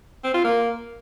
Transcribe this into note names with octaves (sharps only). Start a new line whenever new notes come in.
C4
F4
A#3